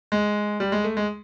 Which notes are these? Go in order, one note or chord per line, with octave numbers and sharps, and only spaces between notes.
G#3
G3
G#3
A3
G#3